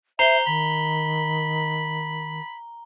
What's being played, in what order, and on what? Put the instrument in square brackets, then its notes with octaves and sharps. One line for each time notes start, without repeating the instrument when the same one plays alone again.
[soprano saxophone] C5 [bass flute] E5 [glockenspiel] A#5 G7
[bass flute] D#3 [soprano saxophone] B5